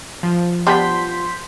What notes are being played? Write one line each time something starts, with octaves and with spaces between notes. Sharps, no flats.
F3
G3 B3 D4 C6 G6 B6